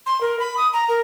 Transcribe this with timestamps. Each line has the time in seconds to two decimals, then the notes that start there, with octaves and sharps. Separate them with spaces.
0.06 C6
0.21 A#4
0.40 B5
0.57 D#6
0.73 A#5
0.89 A#4